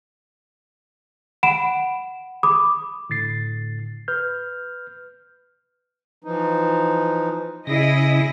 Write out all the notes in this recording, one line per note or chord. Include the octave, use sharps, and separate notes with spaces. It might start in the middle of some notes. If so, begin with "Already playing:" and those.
F#5 B5 D7 E7
B5 D6 D#6
A2 D3 A6 C7
B4 F6 G6
E3 F3 D#4
C#3 E4 G#4 D#5 A#6